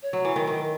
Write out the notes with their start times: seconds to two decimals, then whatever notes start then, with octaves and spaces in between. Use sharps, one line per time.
0.02 C#5
0.13 F#3
0.25 E3
0.36 D#3
0.47 D#3